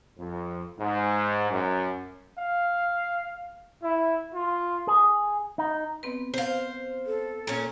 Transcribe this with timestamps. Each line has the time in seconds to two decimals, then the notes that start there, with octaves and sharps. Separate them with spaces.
0.18 F2
0.79 G#2
1.51 F#2
2.38 F5
3.83 E4
4.34 F4
4.87 G#4
5.58 D#4
6.03 B3 C4 B4
6.34 C5 F5
7.06 A4
7.47 A#2 C#4